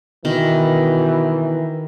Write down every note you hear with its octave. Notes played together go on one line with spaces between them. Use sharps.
B2 D#3 E3